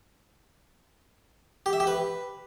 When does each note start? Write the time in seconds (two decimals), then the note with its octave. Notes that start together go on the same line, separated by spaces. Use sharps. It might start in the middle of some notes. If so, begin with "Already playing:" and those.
1.66 G4
1.73 E5
1.80 G4
1.87 B4